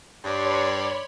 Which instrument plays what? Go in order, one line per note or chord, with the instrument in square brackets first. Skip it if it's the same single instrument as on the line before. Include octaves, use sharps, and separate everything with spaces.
[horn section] G2 [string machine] C#5 B5 C6 [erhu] D5